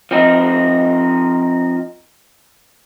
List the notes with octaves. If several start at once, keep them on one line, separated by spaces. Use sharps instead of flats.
F3 C4 D#4